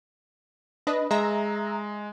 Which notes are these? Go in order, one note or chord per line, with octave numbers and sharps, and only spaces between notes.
D4 B4 D#5
G#3 E5 A#5